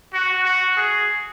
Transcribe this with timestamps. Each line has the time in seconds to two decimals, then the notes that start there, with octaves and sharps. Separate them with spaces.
0.13 F#4
0.45 F#4
0.77 G#4